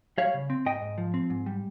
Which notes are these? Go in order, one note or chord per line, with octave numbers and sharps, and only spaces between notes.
G3 C#5 F5
C#3
C4
G#2 D#5 G5
G#2
F3
C4
G#2
G3